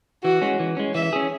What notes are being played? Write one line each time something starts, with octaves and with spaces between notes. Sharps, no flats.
E3 F#4
G#3 C#4
E3
G#3 C#4
E3 E5
C#4 G#4